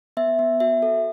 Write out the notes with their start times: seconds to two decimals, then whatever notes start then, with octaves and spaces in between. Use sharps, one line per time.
0.17 B3 E5
0.39 B3
0.60 F#4 E5
0.82 A4